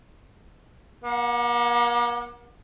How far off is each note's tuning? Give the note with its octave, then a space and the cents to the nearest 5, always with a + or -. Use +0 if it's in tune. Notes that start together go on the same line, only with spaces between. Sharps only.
A#3 +40 F#5 -15